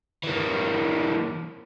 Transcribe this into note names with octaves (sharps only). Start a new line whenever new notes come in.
E3 A#3